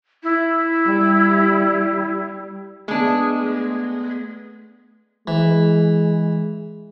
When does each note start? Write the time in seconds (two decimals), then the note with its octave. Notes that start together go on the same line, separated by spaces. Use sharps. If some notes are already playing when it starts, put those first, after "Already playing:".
0.23 E4
0.85 G3
2.88 G#3 A3 B3 D4
5.28 E3 G#3